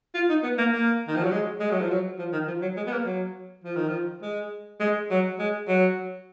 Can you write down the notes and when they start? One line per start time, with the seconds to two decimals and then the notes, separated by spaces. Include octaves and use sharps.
0.14 F4
0.29 D#4
0.43 B3
0.58 A#3
0.73 A#3
1.08 D#3
1.15 F3
1.23 F#3
1.31 G#3
1.60 G#3
1.71 F#3
1.81 F3
1.90 F#3
2.19 F3
2.32 D#3
2.47 F3
2.62 F#3
2.77 G#3
2.87 B3
2.92 A#3
3.05 F#3
3.64 F3
3.76 D#3
3.88 F3
4.22 G#3
4.80 G#3
5.10 F#3
5.39 G#3
5.68 F#3